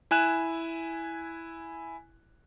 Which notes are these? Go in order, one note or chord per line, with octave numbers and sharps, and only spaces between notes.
E4 G#5 F#6 E7